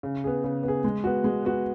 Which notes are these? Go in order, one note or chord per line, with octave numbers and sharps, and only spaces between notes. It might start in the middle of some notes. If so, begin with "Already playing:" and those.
C#3
B3 G#4
C#3
B3 G#4
G#3
B3 F#4
G#3
B3 F#4